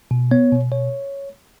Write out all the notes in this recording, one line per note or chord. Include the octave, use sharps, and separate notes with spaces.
B2
B3 C#5
B2
B2 C#5